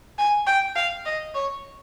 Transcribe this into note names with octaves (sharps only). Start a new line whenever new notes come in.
G#5
G5
F5
D#5
C#5